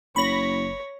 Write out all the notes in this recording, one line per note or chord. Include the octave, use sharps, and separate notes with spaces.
F#1 C#5 B5 A#6